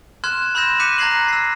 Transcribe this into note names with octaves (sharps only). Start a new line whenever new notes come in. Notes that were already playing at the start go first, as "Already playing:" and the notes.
C6 F6 F#6 G#6 E7
B5 C6 E6 G6 A#6 E7
D6 F#6 G6 B6 C#7 D#7
A#5 F#6 G#6 A#6 C7 F#7
E6 A#6 C7